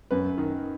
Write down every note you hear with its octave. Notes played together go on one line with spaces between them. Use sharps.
F#2 B4
D#3